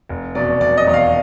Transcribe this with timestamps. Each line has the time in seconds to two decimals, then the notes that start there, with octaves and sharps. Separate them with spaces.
0.09 F1
0.35 E2 B2 F#3 D5
0.61 F1 D5
0.77 D#5
0.85 E2 B2 F#3
0.94 F5